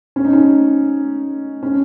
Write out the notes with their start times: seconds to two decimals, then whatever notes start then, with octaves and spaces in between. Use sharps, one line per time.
0.16 C#4
0.25 D#4
0.33 C#4
1.63 C#4